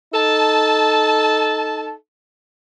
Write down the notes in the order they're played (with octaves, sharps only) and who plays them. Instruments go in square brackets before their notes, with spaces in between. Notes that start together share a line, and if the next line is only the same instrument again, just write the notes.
[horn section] D#4 A4 A5